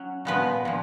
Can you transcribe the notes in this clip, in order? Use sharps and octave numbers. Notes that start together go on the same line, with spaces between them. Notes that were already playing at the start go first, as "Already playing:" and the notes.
Already playing: F#3 C#4
A#2 F3 G#3 B3 B4
A#2 F3